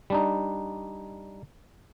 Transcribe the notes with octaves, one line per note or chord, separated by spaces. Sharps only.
G3 D4 D#4